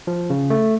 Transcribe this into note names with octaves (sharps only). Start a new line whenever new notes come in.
F3
C#3
A3